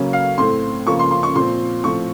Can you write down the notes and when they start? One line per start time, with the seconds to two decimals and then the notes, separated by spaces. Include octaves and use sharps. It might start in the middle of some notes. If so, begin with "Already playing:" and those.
Already playing: C#3 F#3 A#3 C#4
0.13 F5
0.38 A2 A3 C4 C6
0.86 C#3 F3 A#3 C#6
0.99 C6
1.11 C6
1.23 C#6
1.35 A#2 F3 C4 C6
1.84 A2 F3 C4 C#6